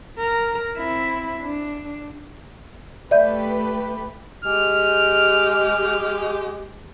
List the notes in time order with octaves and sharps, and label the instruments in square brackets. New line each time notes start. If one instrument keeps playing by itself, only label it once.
[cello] A#4
C4 E4
D4
[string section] A3 G4 B4 [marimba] D5 E5 G6
[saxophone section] G#3 G4 [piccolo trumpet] F6